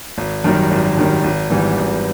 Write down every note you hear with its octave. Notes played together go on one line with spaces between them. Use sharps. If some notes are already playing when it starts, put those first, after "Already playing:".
G#1
F#2 D#3 G3
G#1
F#2 D#3 G3
G#1
G#2 E3 G3 B3
G#1